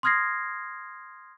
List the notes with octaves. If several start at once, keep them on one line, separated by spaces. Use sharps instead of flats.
C6 D#6 F6 G#6 A#6 C7